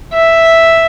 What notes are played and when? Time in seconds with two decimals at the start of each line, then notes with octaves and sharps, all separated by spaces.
0.13 E5